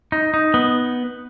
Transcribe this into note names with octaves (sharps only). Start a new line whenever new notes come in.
D#4
D#4
B3